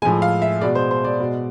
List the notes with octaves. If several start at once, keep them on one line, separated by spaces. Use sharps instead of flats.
A2 F3 G#3 G#5
F5
E5
B2 G#3 D5
C5
C5
D5
B2 G#3